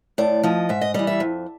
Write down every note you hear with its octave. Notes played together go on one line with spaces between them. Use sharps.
A2 D5
F3 D#5
G#2 E5
D#5
E3 G3 D#5
E5
F2